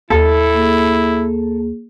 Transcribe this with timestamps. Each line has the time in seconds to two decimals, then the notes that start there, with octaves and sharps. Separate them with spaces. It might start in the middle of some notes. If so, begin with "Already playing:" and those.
0.10 D#2 E4 A4
0.54 A#3 G#4